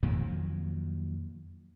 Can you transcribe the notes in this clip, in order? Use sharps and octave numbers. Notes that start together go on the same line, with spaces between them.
F2 A#2 D#3 F#3